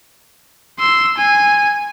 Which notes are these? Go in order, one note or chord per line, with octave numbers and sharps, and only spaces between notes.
C6 E6
G#5